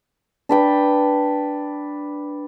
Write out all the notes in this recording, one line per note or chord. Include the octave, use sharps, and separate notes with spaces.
D4 B4 G5